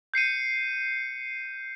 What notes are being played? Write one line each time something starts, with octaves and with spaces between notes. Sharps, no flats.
G6 C7 C#7 D#7